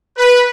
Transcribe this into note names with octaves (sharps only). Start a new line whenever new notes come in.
B4